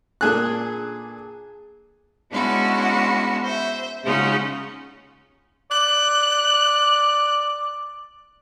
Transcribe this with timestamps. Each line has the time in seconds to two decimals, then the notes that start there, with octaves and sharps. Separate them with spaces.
0.21 A#2 D4 G#4 A4 F#6
2.32 G#3 B3 C#4 D4 E4 F#4
3.44 C5 E5
4.03 C#3 G#3 C#4 D#4 F4 F#4
5.71 D5 F#6